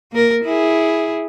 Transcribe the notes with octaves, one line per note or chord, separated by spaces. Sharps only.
A#3 A#4
E4 G#4